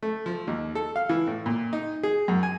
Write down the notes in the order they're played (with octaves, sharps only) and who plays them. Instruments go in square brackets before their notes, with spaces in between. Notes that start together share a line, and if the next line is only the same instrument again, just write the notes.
[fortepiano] A3
F3
D#2
A4
F5
E3
A2
A#2
D#4
G#4
F#2
G#5